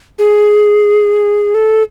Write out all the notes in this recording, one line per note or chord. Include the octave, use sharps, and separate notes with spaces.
G#4
A4